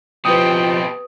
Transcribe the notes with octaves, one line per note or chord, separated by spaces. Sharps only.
B2 F3 C4 G4 B4 G5 D#6